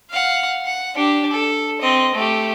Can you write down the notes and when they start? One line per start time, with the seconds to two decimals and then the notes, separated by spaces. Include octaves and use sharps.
0.10 F5 F#5
0.66 F#5
0.95 D4 G4
1.31 A4
1.81 C4 D#5
2.15 A3 G4